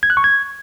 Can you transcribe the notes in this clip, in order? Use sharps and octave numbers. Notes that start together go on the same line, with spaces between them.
G#6
F#6
C#6
G#6